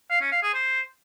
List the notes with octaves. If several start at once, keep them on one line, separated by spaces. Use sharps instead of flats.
F5
C#4
F5
G#4
C5